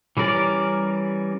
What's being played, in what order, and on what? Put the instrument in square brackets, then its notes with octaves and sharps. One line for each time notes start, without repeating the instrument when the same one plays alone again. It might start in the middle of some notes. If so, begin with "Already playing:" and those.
[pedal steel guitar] E3 G3 C#4 A#4 D5